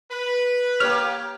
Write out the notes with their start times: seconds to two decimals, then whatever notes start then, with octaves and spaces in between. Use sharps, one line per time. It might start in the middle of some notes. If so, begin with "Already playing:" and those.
0.11 B4
0.80 A#3 G4 C#5 F6